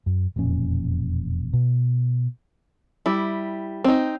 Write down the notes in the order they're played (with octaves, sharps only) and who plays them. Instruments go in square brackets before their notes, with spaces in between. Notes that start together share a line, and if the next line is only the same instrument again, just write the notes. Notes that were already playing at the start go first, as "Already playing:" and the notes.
[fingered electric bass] F#2
E1 F2 A#2 C#4
B2
[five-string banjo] G3 E4
C4 D#4